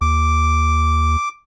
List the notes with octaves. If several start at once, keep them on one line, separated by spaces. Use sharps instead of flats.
D#2 D6